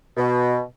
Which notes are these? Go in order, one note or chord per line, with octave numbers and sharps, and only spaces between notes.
B2